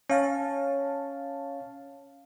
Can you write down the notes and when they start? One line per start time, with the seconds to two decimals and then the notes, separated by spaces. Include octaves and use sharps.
0.10 C#4 C#5 F5 A5